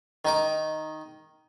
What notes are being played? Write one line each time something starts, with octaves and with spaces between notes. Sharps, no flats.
D#3 D#4 D6